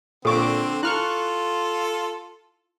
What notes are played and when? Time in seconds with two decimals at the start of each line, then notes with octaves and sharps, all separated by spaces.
0.25 A#2 D3 C4 A4 C#6 D6
0.83 E4 F4 A4 A5 C#6 F6 F#6